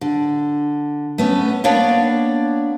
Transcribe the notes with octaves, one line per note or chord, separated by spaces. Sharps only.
D3
A3 B3 C#4
A#3 B3 D4 C#5 D5